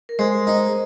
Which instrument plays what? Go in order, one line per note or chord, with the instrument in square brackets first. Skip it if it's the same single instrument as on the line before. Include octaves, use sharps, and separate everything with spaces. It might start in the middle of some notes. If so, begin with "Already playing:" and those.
[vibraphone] A#4
[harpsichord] G#3 [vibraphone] C5
[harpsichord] D#4